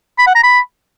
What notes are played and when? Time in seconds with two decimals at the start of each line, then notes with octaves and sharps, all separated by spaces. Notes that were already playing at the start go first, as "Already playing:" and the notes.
0.18 B5
0.27 F#5
0.35 A#5
0.43 B5